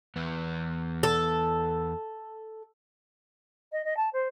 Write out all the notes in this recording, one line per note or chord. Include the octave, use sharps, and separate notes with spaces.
E2 B3
A4
D#5
D#5
A5
C5